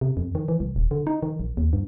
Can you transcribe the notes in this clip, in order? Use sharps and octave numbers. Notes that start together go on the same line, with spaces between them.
C3
F2
D#3
E3
C2
D#1
D3
D#4
D#3
A#1
D#2
G2